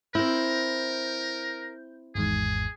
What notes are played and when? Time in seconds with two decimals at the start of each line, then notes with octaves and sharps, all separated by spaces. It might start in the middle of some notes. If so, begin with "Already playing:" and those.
0.15 C4 E4 A#4 G6
2.15 G#1 E2 G#2 G#4